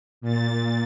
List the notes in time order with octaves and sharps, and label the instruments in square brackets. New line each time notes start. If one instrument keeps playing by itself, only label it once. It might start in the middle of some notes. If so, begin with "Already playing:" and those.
[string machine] A#2 A6